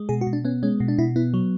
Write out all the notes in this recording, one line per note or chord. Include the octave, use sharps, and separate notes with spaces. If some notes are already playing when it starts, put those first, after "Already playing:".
Already playing: G#3
B2 G#4
F#4
B2
D4
B3 C#4
G#3 C#4
B2
D4
B2 E4
B3 E4
F#3